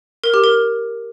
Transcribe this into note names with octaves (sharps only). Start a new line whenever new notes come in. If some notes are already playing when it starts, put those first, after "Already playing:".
A#4
G4
A#4